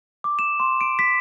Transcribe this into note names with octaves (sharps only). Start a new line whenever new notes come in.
D6
E7
C6
D7
B6